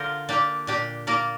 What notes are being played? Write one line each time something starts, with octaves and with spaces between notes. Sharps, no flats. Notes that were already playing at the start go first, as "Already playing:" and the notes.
Already playing: D3 F4 A#4 C5 D5
A#3 D4 G4
A#2 D4 G4
A#3 A#4 D5